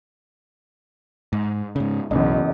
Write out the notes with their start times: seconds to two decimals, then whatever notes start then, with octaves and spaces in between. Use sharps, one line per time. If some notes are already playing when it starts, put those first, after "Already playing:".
1.33 G#2
1.76 G#2 C#3
2.11 F#1 B1 E2 D#5